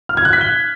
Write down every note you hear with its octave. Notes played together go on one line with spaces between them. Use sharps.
F6
G#6
F#6
B6
G7